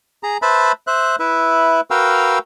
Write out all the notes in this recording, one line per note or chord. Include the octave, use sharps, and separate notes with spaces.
G#4 A#5
B4 C5 E5 A5 B5
C5 E5 F#6
E4 B4 E5
F#4 A#4 B4 F5 G5 E6